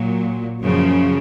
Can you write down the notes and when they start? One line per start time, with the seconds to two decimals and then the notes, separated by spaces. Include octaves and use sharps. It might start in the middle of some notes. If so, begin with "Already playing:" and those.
Already playing: A#2 F#3
0.61 F#2 C#3 F3